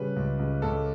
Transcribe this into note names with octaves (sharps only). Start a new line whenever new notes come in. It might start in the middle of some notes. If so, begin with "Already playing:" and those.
Already playing: C#3 G3 B4
C#2
C#2
C#2 A4